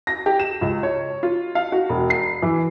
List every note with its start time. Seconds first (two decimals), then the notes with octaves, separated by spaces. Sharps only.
0.07 A#6
0.26 G4
0.40 E7
0.61 C#2
0.83 C#5
1.23 F4
1.55 F5
1.72 F#4
1.89 E1
2.10 C7
2.42 E3